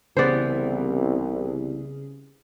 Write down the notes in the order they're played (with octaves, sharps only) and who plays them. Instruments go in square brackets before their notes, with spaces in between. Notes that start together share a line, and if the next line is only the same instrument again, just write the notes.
[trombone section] C2 [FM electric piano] C#3 C#4 G#4 [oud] E3 B3 [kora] C5 D5